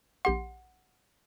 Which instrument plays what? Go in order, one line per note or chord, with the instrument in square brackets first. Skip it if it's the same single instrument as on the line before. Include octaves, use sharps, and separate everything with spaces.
[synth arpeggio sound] A#1 G4 C6 [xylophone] F#5